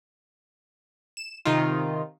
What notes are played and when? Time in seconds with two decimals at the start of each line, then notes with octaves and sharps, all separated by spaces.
1.17 E7
1.45 C3 D#3 D#4 F4